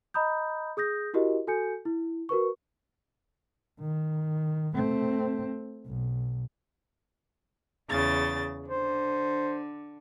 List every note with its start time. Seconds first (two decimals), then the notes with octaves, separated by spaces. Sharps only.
0.14 D#5 A#5 B5 D#6 G6
0.77 G#4 D#6 G6 A#6
1.14 E4 F#4 G4 A#4 D#5
1.47 F#4 A4 G#5 G6 C#7
1.85 E4
2.29 F#4 A#4 B4 C#6
3.80 D#3
4.75 A3 C4
5.86 B1
7.90 E2 C#3 A6
8.68 D3 C5